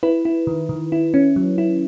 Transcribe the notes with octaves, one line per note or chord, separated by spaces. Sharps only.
E4 B4
E4
D#3
D#3
E4
C#4
F#3
E4